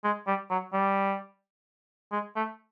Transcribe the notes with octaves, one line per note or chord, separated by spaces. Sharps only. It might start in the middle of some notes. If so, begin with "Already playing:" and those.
G#3
G3
F#3
G3
G#3
A3